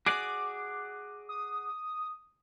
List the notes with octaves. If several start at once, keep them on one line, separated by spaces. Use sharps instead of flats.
F#4 G#4 D5 D6
D#6